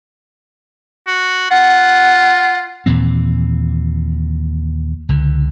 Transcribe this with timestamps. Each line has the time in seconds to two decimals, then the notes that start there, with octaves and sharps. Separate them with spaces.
1.07 F#4
1.51 F4 F#5
2.86 D#2 A#2 E3 C4
5.09 C#2 D3